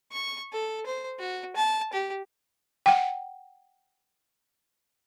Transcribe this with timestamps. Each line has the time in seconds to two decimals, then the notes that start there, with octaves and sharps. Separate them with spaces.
0.12 C#6
0.53 A4
0.86 C5
1.19 F#4
1.56 A5
1.93 G4
2.86 F#5 G5